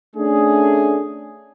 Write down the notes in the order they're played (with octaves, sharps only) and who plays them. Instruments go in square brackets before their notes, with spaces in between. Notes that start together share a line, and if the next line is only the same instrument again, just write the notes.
[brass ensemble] A3 C#4 D4 G#4